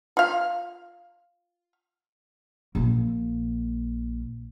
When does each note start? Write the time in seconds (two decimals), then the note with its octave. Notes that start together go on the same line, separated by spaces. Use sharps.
0.17 F4 F5
2.75 A#1 A#3